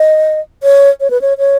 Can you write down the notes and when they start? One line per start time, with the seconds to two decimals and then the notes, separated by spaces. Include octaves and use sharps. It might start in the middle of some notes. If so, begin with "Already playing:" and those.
Already playing: D#5
0.63 C#5
1.00 C#5
1.10 B4
1.21 C#5
1.38 C#5